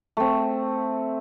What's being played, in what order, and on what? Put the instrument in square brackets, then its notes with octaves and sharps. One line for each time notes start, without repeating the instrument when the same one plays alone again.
[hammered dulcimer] A3 C4